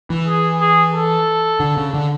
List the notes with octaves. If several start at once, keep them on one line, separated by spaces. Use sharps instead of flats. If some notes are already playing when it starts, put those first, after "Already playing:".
E3
G#4
G#4
A4
D3
C#3
D3